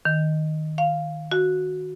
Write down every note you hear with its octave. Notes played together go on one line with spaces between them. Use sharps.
D#3
F5
F#4